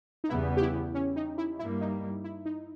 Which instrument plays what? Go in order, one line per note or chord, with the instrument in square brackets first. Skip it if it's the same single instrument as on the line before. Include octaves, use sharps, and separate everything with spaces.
[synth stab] D#4
[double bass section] E2 C#3 G3 B3 [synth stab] E4
[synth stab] G4
E4
C#4
D#4
E4
[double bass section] G2 G3 A#3 [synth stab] E4
[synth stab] D#4
E4
D#4